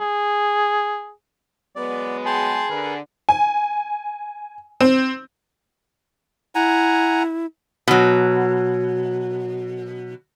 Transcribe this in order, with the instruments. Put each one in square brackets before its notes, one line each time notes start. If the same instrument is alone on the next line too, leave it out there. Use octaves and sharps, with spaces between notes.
[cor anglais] G#4
[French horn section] F#3 G#3 B3 [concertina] D5
[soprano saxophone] G#4 [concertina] G5 A5 C6
[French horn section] D3 [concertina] A#4 B4
[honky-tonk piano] G#5
C4
[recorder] E4 [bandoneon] F#5 G#5 A#5
[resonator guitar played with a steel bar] B2 F#3